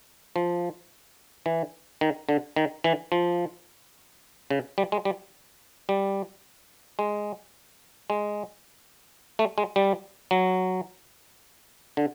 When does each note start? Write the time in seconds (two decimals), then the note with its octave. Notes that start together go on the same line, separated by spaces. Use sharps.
0.36 F3
1.46 E3
2.01 D#3
2.29 D3
2.56 D#3
2.84 E3
3.12 F3
4.50 C#3
4.78 G3
4.92 G#3
5.05 G3
5.89 G3
6.99 G#3
8.10 G#3
9.39 A3
9.58 G#3
9.76 G3
10.31 F#3
11.97 D3